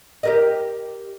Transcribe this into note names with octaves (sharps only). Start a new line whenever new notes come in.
G4 A#4 D#5